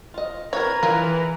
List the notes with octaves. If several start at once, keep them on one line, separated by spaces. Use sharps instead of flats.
F4 D#5
C4 D4 A#4 B4 C#5 A#5 G#6
E3 F4 G#4 A#4 G#5